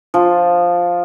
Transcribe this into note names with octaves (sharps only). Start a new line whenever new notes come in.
F3